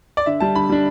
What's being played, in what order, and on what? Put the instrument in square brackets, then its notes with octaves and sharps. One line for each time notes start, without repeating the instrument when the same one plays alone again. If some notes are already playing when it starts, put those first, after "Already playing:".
[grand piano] D5
D3 E5
G3 D4 A5
D3 B5
G3 D4